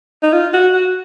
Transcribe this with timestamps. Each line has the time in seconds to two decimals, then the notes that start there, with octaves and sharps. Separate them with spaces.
0.23 D#4
0.33 F4
0.54 F#4
0.73 F#4